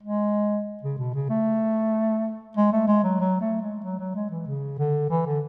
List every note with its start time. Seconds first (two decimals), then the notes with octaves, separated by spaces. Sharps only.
0.03 G#3
0.83 C#3
0.98 B2
1.14 C#3
1.29 A3
2.57 G#3
2.73 A3
2.88 G#3
3.04 F#3
3.20 F#3
3.41 A3
3.62 G#3
3.84 F#3
3.99 F#3
4.15 G#3
4.30 E3
4.47 C#3
4.79 D3
5.10 E3
5.26 D3